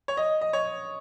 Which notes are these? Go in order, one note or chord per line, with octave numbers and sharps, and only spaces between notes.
C#5
D#5
D#5
C#5